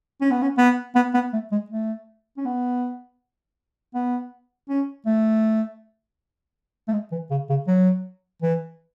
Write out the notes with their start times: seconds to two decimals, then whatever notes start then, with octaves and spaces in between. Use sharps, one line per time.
0.21 C#4
0.31 B3
0.42 C#4
0.57 B3
0.95 B3
1.14 B3
1.33 A3
1.52 G#3
1.70 A3
2.37 C#4
2.45 B3
3.94 B3
4.69 C#4
5.06 A3
6.88 A3
6.93 G#3
7.12 E3
7.30 C#3
7.49 C#3
7.67 F#3
8.42 E3